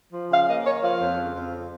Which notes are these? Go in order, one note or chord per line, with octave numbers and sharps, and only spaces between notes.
F3
C#3 F5
A#3 D#5
A#3 C#5
F3 F5
F2
C#3
F2